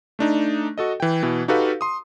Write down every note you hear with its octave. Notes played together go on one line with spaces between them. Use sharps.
A3 D4 D#4
F#4 A4 D#5
E3 G5
B2 E3
D#4 F#4 G4 A4 B4 F5
C6 D#6